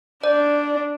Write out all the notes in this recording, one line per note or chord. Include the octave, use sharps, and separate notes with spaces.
D4 D5